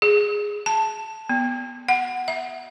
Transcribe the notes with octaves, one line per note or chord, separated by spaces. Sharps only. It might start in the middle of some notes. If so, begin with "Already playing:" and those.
G#4
A5
B3
F#5
E5